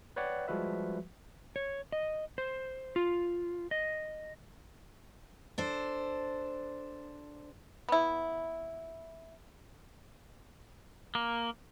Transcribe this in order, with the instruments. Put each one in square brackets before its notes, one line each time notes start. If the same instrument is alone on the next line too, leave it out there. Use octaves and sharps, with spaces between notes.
[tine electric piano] B4 C#5 D5 F#5 G5
F3 G3 G#3 F#4 B4 E5
[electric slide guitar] C#5
D#5
C5
F4
D#5
[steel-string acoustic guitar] D4 A4 C5
[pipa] B3 E4
[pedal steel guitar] A#3